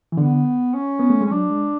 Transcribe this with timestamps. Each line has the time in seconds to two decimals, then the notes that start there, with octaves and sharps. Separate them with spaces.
0.12 E3
0.17 D3 B3
0.74 C#4
0.99 B3
1.10 A3
1.21 G#3
1.26 C#4
1.31 F#3 D4
1.50 G#3